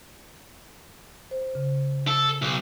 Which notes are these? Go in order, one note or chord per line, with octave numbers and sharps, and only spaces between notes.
C5
C#3
A4
B1